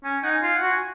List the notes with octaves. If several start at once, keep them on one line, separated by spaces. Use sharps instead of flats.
C#4 G#5
D#4 F#5
G#5
F4
F#5
F#4
G#5